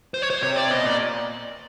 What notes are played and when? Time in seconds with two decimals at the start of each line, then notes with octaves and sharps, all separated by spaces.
0.14 C5
0.22 C#5
0.30 C5
0.42 C3 C#5
0.56 D5
0.71 B2 D#5
0.85 A#2 D5